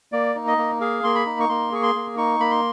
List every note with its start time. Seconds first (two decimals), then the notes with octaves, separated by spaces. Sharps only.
0.12 A#3 D5
0.35 D#4
0.47 D#5
0.58 A#3
0.81 G#4 F5
1.03 A#3 C6
1.15 B5
1.26 D#4
1.40 C#6
1.49 A#3 C6
1.72 G#4 C#6
1.83 C6
1.95 A#3
2.17 D#4 C#6
2.40 A#3 B5
2.51 C6